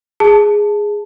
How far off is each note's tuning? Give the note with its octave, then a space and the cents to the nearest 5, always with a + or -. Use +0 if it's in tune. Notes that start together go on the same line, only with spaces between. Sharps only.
G#4 +0 A5 +0